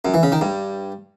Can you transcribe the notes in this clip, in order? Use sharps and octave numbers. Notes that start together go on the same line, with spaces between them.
F#2
E3
C#3
D#3
G2